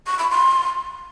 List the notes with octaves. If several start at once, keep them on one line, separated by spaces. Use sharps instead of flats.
C#6
B5
C6